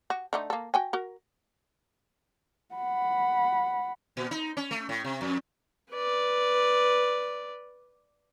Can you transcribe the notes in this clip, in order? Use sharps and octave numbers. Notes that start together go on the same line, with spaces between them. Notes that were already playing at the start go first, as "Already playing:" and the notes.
F#4
D3 A3 D#4
A#3 A4
F#4 G5 G#5
F#4 A#4
F#5 B5
A#2
D#4
C#4
A3
A2
C3
F2
B4 D5